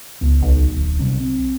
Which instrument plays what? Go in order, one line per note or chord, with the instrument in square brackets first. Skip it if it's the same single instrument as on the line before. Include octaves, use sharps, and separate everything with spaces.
[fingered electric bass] C#2 B3
[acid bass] B1
[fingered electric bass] D1
C3 G3 C#4
C4